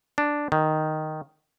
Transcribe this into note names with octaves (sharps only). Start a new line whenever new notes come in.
D4
D#3